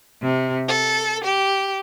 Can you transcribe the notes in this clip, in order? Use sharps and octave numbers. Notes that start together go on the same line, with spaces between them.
C3
A4
G4